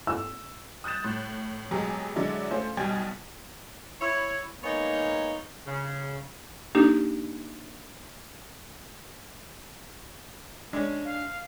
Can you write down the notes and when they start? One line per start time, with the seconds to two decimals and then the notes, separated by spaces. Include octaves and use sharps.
0.07 E6
0.84 D#6 F#6 G6 A6 E7
1.04 A2
1.71 B2 F#3 G#3 G4 G#4 A#5
2.16 D3 F#3 G#3 E4 D5
2.51 A3 C#4 F4 C5
2.77 B1 B2 G3 G5 G#5 G#6
4.01 E4 C#5
4.64 G#3 A#3 B3 D#4 C#5
5.67 C#3
6.75 A#3 D4 D#4 G4
10.73 G#3 C#4 D4
11.05 F5